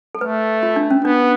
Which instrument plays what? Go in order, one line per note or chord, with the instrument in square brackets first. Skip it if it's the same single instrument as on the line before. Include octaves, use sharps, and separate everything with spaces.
[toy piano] A4
[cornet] A3 [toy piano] B4
[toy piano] F4
D4
C#4
[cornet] B3 [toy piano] D4